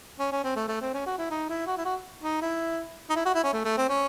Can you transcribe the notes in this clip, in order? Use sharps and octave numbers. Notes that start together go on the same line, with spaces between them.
C#4
C#4
C4
A3
A3
C4
C#4
F#4
E4
D#4
E4
F#4
E4
F#4
D#4
E4
D#4
E4
F#4
E4
C#4
A3
A3
C4
C#4